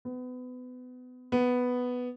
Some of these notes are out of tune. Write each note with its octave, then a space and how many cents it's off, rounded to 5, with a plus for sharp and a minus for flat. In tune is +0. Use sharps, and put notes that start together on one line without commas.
B3 +30
B3 +5